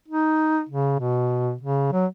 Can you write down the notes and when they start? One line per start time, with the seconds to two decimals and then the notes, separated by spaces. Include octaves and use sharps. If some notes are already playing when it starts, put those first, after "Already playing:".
0.08 D#4
0.69 C#3
1.00 B2
1.61 C#3
1.92 F#3